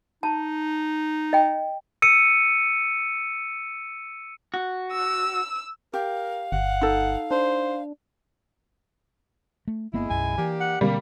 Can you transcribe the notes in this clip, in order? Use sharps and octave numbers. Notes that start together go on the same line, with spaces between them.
D#4 A5
D#5 G5
E6 C#7 D#7
F#4
E6
G4 A#4 F5
G1 F#5
D#4 A4
D4 C5
A3
G1 G#3 A#3 B3 E4
B1 F#2 G#5
E3 A#3 D4 G4
F#5
B2 D3 G3 A#3 C4